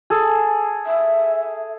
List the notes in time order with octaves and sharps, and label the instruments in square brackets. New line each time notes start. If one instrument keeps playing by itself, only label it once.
[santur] G#4 A4
[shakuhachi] E5